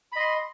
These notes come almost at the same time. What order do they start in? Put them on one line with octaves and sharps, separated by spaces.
B5 D#5 C6